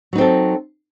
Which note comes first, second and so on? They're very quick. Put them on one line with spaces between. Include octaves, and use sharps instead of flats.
F#3 D#4 C4 A4